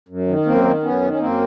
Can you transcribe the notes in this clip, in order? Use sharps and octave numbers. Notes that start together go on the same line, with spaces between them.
F#2
D#3
F#2 A#3 C4
D#3
F#2 B3 C#4
D#3
C#4
F#2 A#3 C4